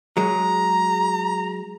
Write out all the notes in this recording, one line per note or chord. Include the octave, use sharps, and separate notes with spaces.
F#3 G#3 A#5